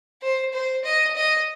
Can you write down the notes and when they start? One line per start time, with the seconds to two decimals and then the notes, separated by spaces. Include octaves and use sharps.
0.22 C5
0.53 C5
0.84 D#5
1.16 D#5